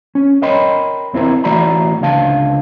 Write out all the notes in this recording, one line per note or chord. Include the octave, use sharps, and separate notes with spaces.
C#4
A#4 C#5 D#5 G5 B5 C6
E2 C4 E4 G4 A#4
E3 A3 F#4 D5 A#5 B5
C#2 D3 F5 A5